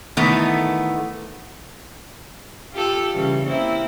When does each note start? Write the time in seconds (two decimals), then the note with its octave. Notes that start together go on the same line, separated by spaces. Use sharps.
0.17 D#3 E3 A3 B3
2.73 F4 G4 A4
3.13 C#3 E3 G3
3.44 A#3 C4 E4